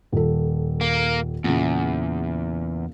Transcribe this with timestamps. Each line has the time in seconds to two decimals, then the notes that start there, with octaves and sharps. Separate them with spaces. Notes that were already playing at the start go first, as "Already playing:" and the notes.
0.12 D#1 A4
0.81 A#3
1.44 E2 A#2 C#3